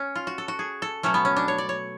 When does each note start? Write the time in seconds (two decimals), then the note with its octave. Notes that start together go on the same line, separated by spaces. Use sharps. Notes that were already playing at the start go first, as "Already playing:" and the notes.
Already playing: C#4
0.15 F4
0.27 F#4
0.38 A4
0.48 F#4
0.59 G#4
0.82 A4
1.03 B2 F#3 A3 C#4
1.14 B3
1.25 C#4
1.36 D4
1.48 C#5
1.58 D5
1.69 C#5